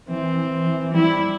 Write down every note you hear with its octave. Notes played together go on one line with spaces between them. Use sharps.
E3 C4
E3
E3
G3 E4